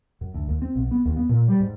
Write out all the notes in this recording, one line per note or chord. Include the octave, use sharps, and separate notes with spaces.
F#2
D2
D#2
C4
B1
B3
D#2
B3
A#2
G3
G#2